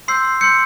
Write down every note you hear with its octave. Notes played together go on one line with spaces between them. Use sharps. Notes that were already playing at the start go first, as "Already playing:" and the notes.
C6 E6 G6 C7
C6 E6 G6 C#7